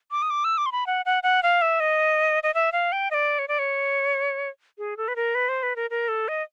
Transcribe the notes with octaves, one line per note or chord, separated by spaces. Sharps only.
D6
D#6
D6
E6
D6
C6
B5
F#5
F#5
F#5
F5
E5
D#5
D#5
E5
F5
G5
D#5
D5
C#5
D5
C#5
G#4
A4
B4
A#4
B4
C5
B4
A#4
A#4
A4
D#5